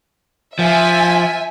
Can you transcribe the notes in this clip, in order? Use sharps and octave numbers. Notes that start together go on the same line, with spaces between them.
F3 E5 G#5